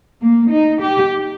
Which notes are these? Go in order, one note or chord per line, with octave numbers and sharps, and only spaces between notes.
A#3
D#4
G4